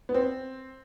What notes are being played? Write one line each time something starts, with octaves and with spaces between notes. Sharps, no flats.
B3
C4